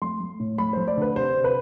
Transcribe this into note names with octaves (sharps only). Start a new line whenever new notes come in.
A3 C6
A3
A2
A3 B5
A3 C5
D5
D3 B4
C3 C5
C3
B4